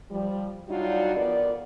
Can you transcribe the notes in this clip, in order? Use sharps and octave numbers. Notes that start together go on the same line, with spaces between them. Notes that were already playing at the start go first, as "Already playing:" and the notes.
F3 G3
F#3 G3 D4 D#4 F4 F#4
F2 B3 F4 A#4 D5